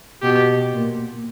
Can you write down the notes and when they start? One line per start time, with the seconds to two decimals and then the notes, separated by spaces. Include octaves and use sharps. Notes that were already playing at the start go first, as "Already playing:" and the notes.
0.22 B2 G4
0.73 A#2